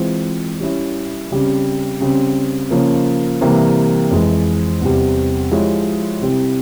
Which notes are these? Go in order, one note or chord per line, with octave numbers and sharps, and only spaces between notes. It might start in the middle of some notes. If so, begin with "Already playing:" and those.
Already playing: E3 G#3 C4 F4 C5
G3 C#4 E4
C#3 G3 C4
C#3 G3 C4
C#3 F3 A#3 C#4
C3 E3 G3 A#3
F2 E3 G#3
E2 C3 G3
F3 G#3 E4 G4 C#5
C3 G3 C4 E4 G4